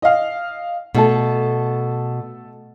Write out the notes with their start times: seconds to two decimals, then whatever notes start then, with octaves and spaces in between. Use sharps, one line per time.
0.02 D#5 F5
0.95 B2 A3 A4 A5